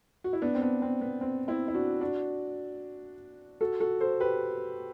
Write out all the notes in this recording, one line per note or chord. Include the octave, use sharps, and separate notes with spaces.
F#4
E4
B3 D4
C4
B3 D4
C4
B3
C4
C4 E4
E4
D4 F#4
D4 F#4
F#4 A4
F#4 A4
A4 C5
G4 B4